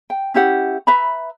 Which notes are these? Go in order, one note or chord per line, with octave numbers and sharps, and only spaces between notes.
G5
C#4 E4 G4 F#5
B4 E5 A#5 B5